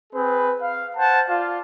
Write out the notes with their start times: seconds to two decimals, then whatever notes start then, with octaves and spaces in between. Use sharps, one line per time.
0.13 C4 G#4 B4
0.61 F5
0.97 C5 F#5 A5
1.28 F4 D5 F5